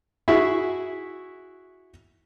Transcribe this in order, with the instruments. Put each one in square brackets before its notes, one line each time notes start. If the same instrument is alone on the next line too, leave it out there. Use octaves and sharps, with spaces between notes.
[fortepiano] E4 F#4 G#4 E5 C#6